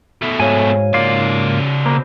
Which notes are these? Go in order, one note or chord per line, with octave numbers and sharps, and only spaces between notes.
B2 A3
G#2 F#4 C#5 F5 G#5
G#2 C#3 A#3 F4 D5
B2 A#3 C5